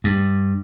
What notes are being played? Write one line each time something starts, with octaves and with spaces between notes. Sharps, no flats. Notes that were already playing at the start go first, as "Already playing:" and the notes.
G2